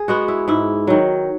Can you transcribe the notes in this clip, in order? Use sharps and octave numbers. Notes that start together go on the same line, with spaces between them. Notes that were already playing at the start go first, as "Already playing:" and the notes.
Already playing: G#4
G#3 B3 F#4
E4
G#2 E4
D#3 F#3